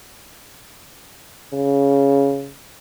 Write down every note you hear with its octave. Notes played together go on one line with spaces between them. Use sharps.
C#3